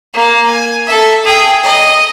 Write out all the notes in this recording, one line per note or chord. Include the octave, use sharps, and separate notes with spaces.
A#3 F5
G#5
A4 E5
G#4 G5
D#5